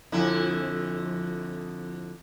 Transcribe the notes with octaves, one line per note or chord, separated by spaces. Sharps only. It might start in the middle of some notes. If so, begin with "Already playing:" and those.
F2 D3 E4